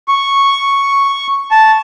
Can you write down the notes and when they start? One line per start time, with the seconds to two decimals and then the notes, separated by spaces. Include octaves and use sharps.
0.08 C#6
1.51 A5